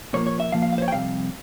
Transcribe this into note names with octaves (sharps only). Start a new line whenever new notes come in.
A#2 F3 A#3 C#5
C#5
E5
A#2 F3 A#3 F5
F5
F5
C5
C#5
G5
F2 C3 G3 F5